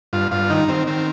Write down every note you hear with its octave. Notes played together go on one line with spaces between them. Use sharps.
G2 F4
G2 F4
D#3 D#4
D#3 C4
D#3 C4